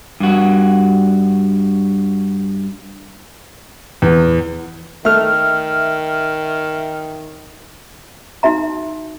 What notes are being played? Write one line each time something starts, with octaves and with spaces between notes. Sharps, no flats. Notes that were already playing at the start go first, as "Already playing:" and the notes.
G2 F#4
E2
D#3 A3 E5 F6
D#4 F#4 E5 A#5